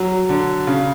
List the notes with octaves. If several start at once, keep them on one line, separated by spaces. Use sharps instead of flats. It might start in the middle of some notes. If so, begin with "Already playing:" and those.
Already playing: F#3
D3
C#3